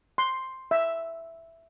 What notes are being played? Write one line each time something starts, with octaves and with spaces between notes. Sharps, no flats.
C6
E5